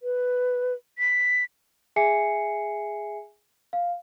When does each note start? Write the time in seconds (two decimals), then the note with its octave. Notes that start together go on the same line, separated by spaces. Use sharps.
0.03 B4
0.98 B6
1.96 G#4 E5 G#5 C7 C#7
3.73 F5